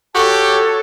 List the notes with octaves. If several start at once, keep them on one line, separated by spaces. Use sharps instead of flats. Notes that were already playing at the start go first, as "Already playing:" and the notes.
F#4 G4 A4 C#5 A5